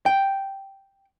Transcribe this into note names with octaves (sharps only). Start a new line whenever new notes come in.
G5